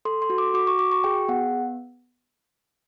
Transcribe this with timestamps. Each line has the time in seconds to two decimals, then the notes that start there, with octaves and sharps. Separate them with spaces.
0.05 A4 C6
0.22 C6
0.30 F#4
0.38 D6
0.54 F#4 D6
0.67 C#6
0.79 F#4 D6
0.92 C#6
1.04 G#4 G5
1.28 B3 F#5